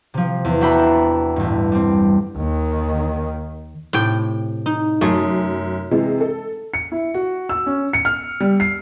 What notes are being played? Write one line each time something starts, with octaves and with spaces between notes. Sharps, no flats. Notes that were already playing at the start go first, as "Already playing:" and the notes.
C3 F3
E2
D4 F#4 E5 G5 A#5 B5
A1 G2
G3 C4
D#2 D#3
A2 C3 G5
D#4
F#2 A3 G#4
C3 E3 G#3
A4
C#7
E4
F#4
E6
C#4
C#7
F6
G3
C7